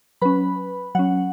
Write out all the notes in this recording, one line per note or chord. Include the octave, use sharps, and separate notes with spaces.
F#3 C#4 B4 B5
F#3 C#4 F#5